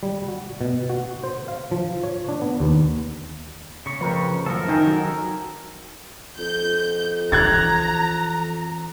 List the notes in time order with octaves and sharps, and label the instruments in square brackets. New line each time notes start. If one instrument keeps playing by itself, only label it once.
[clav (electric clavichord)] G3
F#4
B2
F#4
C5
F5
F3
C#5
D4
B3
D#2
[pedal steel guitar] C#3 C#6
[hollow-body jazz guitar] F2 [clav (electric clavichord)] C4 A#4 B4
[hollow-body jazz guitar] C2 F#2 [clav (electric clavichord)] F3 [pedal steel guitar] A4 A#4
[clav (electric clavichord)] D#3 G5 G#5 [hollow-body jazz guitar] D#4
[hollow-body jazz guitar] F#3
[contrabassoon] F2 [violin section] G6
[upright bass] E3 [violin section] A#5 [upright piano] F#6 G#6 A6